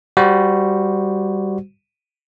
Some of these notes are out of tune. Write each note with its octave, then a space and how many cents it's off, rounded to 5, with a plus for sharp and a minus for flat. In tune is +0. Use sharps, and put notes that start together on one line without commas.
G3 +0 F#4 +0 C5 -15